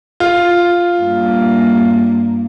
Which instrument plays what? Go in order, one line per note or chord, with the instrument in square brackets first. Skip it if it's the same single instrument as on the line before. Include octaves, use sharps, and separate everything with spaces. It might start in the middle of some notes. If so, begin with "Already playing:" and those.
[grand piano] F4
[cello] G2 A#3